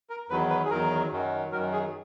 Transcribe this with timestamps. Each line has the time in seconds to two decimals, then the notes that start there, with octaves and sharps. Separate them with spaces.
0.10 A#4
0.29 E2 D#3 F#3 B4
0.50 B4
0.65 G#4
0.70 E2 D#3 F#3 A#4
1.12 F#2 D#3 F#3
1.52 F#2 D#3 F#3 A#4
1.72 G#4